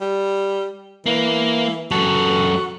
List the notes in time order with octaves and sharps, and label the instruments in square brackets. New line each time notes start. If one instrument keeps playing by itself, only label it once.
[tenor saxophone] G3
[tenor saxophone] E3 [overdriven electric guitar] A#3
[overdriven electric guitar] F#2 A4 [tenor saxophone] F#4